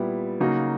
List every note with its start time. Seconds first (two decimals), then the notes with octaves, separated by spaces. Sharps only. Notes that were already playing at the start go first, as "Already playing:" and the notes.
Already playing: A#2 G3 B3 E4
0.40 C#3 F#3 A#3 D#4 F#4